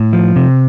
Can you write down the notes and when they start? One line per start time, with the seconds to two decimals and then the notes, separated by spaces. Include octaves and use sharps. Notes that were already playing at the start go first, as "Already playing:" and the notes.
Already playing: A2
0.13 F3
0.36 C3